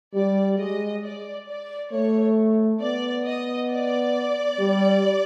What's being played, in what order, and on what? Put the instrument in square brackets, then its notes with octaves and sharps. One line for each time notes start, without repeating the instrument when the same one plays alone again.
[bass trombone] G3 [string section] D5
[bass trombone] G#3 [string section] D#5
[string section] D5
D5
[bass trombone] A3 [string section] C#5
[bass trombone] B3 [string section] D5
[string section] D#5
D5
[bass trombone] G3